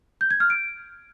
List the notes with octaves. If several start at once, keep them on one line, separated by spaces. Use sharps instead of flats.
G6
G#6
F6
D7